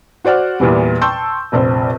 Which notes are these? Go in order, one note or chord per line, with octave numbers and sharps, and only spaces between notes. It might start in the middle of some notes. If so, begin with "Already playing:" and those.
F#4 C5 D5 F#5 F6
E2 A#2 E3 G3
G5 A5 C6 C#6 E6 G6
F1 A#1 C4 C5